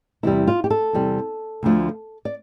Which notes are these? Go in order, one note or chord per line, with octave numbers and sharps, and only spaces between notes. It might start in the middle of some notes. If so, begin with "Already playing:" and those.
E2 C3 G3 E4
F4
G4
A4
E2 C3 G3
D2 D3 F3 A3
D5